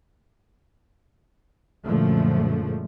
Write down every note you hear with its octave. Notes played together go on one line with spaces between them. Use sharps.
F#2 A#2 D3 F3 G#3 A3